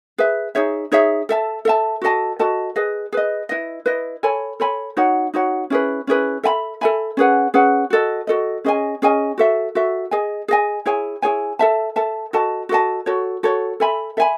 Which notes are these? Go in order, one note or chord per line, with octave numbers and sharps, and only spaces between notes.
G#4 B4 E5
D#4 G#4 C#5 E5
D#4 G#4 C#5 E5
A4 E5 A5
A4 E5 A5
F#4 A4 D#5 A5
F#4 A4 D#5 A5
G#4 B4 D#5
G#4 B4 D#5
E4 B4 D#5
E4 B4 D#5
A4 C#5 G#5 B5
A4 C#5 G#5 B5
D#4 F#4 C#5 F#5
D#4 F#4 C#5 F#5
C#4 E4 G#4 B4
C#4 E4 G#4 B4
A4 E5 G#5 B5
A4 E5 G#5 B5
C#4 G#4 B4 F#5
C#4 G#4 B4 F#5
F#4 A4 D#5
F#4 A4 D#5
C#4 G#4 D#5 G#5
C#4 G#4 D#5 G#5
F#4 A4 E5
F#4 A4 E5
G#4 D#5 G#5
G#4 D#5 G#5
E4 G#4 C#5 G#5
E4 G#4 C#5 G#5
A4 E5 A5
A4 E5 A5
F#4 A4 D#5 A5
F#4 A4 D#5 A5
F#4 A4 C#5
F#4 A4 C#5
A4 E5 G#5 B5
A4 E5 G#5 B5